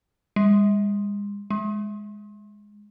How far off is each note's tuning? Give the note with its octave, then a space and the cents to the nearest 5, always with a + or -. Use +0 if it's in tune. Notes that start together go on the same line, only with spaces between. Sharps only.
G#3 -40
G#3 -5